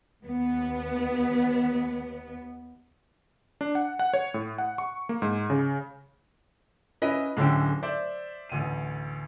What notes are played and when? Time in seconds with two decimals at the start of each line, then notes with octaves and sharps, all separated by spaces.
0.23 D#2 B3
3.61 D4
3.75 F#5
3.99 F#5
4.14 C#5
4.34 A2
4.58 F#5
4.78 C#6
5.09 A#3
5.22 G#2
5.50 C#3
7.02 C#4 E4 B4 D#5
7.37 D1 D3 C#4 E4 G5
7.83 C5 D5 E5
8.49 A1 D2 D#7